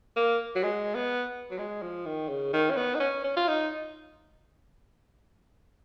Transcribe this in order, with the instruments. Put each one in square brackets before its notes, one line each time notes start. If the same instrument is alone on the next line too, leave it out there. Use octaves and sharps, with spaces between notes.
[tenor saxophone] A#3
F#3
G#3
B3
F#3
G#3
F3
D#3
C#3
D#3
C#4
B3
D#4
C#4
C#4
F4
D#4